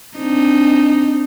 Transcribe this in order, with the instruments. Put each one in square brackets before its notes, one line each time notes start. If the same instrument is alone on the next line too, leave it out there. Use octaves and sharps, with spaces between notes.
[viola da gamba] C4 D4 D#4